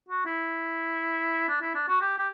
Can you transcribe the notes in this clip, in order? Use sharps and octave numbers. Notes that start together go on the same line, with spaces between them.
F#4
E4
D4
E4
D4
F#4
G4
G4